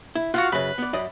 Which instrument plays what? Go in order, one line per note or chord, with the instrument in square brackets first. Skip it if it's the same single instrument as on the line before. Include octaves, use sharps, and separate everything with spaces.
[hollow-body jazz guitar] E4
[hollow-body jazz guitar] F4 [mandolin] F#4 F5 F#5
[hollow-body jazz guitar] F#2 C#3 [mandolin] B4
[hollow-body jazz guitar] B3 D5
F#2 D5 D#5